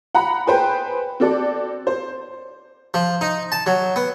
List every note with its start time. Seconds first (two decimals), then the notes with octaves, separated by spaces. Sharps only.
0.15 F#5 A#5 B5
0.47 G#4 B4 C5 G5
1.20 C4 F#4 A4 D5
1.87 C5
2.94 F3
3.21 D#4
3.52 A5
3.66 F#3
3.96 B3